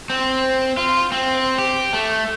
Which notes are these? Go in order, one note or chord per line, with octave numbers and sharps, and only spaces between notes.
C4
F4
C4
G4
A3